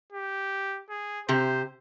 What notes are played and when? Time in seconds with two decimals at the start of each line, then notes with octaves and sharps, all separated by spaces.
0.12 G4
0.90 G#4
1.29 C3 G4 C5